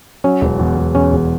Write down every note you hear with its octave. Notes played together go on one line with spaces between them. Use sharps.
F#3 C#4
E1
E2
E1
E2 C#4
E1